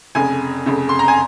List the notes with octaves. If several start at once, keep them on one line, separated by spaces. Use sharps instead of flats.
F1 F2 C#3 G#5
F1 F2 C#3
C6
A#5
G#5